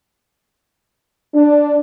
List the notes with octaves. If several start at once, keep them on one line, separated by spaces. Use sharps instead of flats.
D4